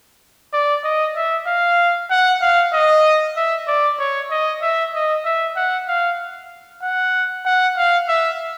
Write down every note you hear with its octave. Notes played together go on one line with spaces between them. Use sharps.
D5
D#5
E5
F5
F#5
F5
D#5
E5
D5
C#5
D#5
E5
D#5
E5
F#5
F5
F#5
F#5
F5
E5